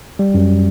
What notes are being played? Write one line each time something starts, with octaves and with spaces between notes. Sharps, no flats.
G3
F#2